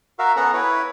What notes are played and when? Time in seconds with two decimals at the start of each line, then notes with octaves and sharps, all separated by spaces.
0.19 F#4 A#4 E5 F5
0.36 B3 C#4 A4 F#5 A#5
0.53 E4 B4 C#5